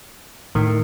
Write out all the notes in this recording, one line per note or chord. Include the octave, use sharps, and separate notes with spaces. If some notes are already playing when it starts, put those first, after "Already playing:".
A2 D#3